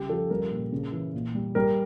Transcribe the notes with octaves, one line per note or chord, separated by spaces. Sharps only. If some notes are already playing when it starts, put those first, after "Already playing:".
Already playing: C#3 G3 G4
F3 A4
G3 A#4
A#2
C#3
E3
A#2
G3
G3 A#4